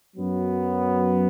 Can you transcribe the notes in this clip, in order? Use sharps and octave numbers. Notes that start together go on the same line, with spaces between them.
F#2 F#3 B3